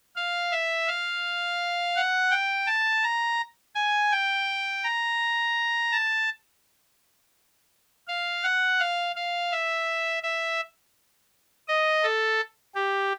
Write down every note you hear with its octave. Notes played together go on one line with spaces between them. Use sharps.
F5
E5
F5
F#5
G5
A5
A#5
G#5
G5
A#5
A5
F5
F#5
F5
F5
E5
E5
D#5
A4
G4